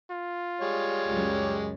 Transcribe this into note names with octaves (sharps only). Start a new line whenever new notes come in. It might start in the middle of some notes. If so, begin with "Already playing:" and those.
F4
G3 G#3 C#5
C#2 F#2